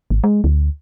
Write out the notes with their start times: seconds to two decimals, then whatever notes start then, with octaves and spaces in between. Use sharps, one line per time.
0.10 G#1
0.24 G#3
0.44 D2